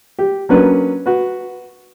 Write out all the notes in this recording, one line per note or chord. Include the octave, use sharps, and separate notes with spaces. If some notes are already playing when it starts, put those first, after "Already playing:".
G4
F#3 A#3 C#4 D4 B4
F#4 B4